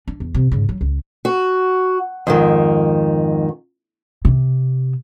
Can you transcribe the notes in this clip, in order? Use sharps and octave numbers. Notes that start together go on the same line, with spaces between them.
D4
E2
C3
G#2 C#3
F#3
C#2
F#4
F2 G#2 D#3
C3